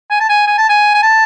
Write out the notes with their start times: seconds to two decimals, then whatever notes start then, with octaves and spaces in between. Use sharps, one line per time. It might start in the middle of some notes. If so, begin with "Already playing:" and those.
0.10 G#5
0.20 A5
0.29 G#5
0.47 G#5
0.58 A5
0.69 G#5
0.94 G#5
1.03 A5